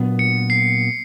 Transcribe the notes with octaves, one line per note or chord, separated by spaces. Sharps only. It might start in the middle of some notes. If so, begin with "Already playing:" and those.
Already playing: A#2 F#3 B3 D4
C#7
C7